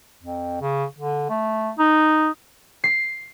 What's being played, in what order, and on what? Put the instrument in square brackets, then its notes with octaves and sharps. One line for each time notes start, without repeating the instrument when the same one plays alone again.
[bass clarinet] F2
C#3
D3
A3
D#4
[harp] C7